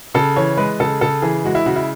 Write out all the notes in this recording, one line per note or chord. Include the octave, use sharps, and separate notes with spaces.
C#3 A4
E3 C#5
G#3 B4
C#3 A4
C#3 A4
E3 G#4
G#3 F#4
E4
C#3 F#4
E4